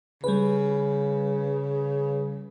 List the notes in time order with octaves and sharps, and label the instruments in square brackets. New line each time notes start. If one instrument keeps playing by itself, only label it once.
[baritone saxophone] C#3 [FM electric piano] G3 B4